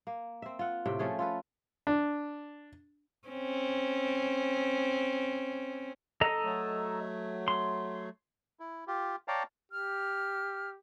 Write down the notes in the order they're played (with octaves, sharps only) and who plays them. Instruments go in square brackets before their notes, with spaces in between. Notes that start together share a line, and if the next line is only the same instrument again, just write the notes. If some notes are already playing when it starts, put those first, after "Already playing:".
[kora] A#3
C4 E5
F4 F#5
A2 C3 G5
F3 A3 C#4 G#4
F4 A4 B4
[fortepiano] D4
[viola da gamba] C4 C#4
[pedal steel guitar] A4 D#5 A#5
[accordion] F#3 A3
[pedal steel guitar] C6
[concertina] E4
F4 G4
C#5 D5 F5 G5 A5 A#5
[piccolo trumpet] G4 [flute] F6